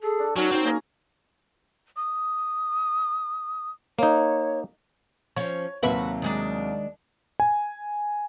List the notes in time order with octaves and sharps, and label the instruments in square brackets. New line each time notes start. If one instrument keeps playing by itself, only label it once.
[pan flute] G#4 [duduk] A4
[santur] D4
[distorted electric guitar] F#3 [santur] C#4 A#4 C#5 [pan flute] D#4 [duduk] F#4
[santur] F#3 [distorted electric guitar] C4 C5 [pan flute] D#4
[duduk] A#3 [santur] C#4 G#4 A#5
[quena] D#6
[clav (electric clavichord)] A#3 D#4 [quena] C#5
[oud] F3 C#4 [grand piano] C#5
[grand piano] D#2 C3 F#3 [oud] F#4 B4 E5
[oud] D#3 G#3 D4
[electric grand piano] G#5